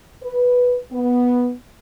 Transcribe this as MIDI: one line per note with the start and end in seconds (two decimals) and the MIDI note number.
0.23 0.78 71
0.92 1.53 59